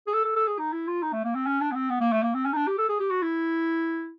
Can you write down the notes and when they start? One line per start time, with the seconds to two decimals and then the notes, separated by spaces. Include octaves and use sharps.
0.07 G#4
0.14 A4
0.25 A4
0.36 A4
0.47 G#4
0.58 D#4
0.73 E4
0.87 F4
1.03 D#4
1.13 A3
1.25 A#3
1.35 C4
1.47 C#4
1.61 D4
1.72 B3
1.75 C4
1.90 B3
2.01 A#3
2.12 A3
2.23 A#3
2.35 C4
2.46 C#4
2.53 D#4
2.56 D4
2.67 G4
2.78 A4
2.89 G#4
3.00 G4
3.11 F#4
3.22 E4